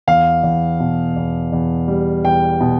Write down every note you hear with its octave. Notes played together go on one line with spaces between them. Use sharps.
E2 F5
E2
B2
E2
E2
G3
E2 G5
B2